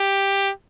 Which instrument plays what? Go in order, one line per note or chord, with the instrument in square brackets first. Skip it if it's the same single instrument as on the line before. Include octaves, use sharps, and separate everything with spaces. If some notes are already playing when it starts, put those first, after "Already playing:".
Already playing: [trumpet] G4